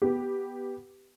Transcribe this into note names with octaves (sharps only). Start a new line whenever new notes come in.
B3 G4